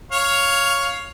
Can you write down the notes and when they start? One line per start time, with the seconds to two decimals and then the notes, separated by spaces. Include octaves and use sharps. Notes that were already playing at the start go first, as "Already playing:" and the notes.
0.12 C#5 F5